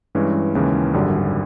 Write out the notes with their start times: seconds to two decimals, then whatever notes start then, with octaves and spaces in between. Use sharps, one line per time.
0.15 G2 E3 G#3 C#4
0.55 D#2 C#3 E3 G#3 C#4
0.94 G#1 F#2 D3 G3